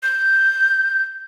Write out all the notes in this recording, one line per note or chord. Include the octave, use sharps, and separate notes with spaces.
G6